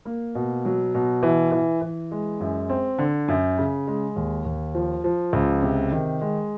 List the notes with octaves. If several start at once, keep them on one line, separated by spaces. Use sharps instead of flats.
A#3
B2
F#3
B2
E3
E3
E3
G#3
F#2
C4
D3
F#2
C#3
G#3
D#2
D#2
F3
F3
C#2
C3
D#3
G#3